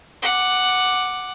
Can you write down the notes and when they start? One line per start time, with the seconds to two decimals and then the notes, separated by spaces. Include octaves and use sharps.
0.23 F#5 D6